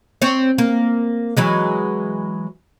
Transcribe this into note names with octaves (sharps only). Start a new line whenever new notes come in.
C4 C#5
A#3
E3 F#3 G#3